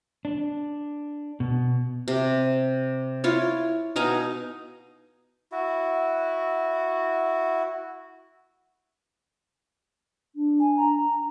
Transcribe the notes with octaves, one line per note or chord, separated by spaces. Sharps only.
D4
B2
C3
E4 F4 C#5
B2 D#4 F5 G#5
E4 F#4
D4
G#5
A#5